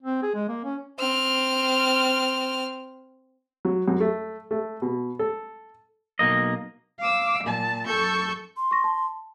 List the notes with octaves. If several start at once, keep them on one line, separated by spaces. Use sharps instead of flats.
C4
G#4
G#3
A#3
C#4
C4 F6
F#3
F#2
A3
A3
B2
A4
B1 A#3 D#5
F5 D6 E6
A#2 A5
F#2 A4 C#6 E6 G6
C6
C#6 A#6
A5